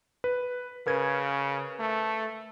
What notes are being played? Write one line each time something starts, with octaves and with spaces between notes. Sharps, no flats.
B4
C#3 A#4 B4 G#6
A3